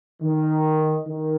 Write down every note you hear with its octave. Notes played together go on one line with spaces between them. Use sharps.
D#3
D#3